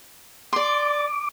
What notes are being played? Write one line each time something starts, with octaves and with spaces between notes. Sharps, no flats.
D5 C6 D6